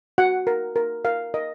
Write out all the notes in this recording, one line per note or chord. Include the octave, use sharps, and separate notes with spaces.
F#4 F#5
A#4
A#4
A#4 F5
A#4 D#5